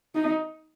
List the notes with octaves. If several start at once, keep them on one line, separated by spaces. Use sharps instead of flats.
D#4